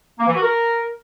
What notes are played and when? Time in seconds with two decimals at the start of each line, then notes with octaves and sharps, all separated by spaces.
0.19 A#3
0.27 E3
0.35 F#4
0.43 A#4